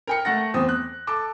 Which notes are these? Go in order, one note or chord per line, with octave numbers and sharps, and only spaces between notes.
A#4 G5 C#7
A3 F#5 A#6
E2 C4 D#6
F#6
A4 A5 D6